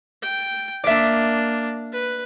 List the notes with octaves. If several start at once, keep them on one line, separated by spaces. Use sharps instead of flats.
G5
A#3 D4 D5 E5
B4